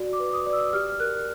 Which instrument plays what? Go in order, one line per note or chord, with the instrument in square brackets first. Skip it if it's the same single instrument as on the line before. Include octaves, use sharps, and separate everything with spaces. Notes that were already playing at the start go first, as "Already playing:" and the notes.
Already playing: [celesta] F#4 D5
D6
B4
D#6
D5
E6
G4 F6
A#4 F#6